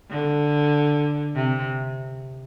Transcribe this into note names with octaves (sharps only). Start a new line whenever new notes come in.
D3
C3